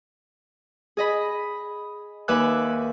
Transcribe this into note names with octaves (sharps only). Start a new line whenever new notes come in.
G#4 D#5 B5
D#2 B4 E5 G#5 D6 F#6